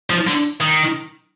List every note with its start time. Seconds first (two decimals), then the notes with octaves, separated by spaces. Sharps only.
0.10 F3
0.27 D3
0.61 D#3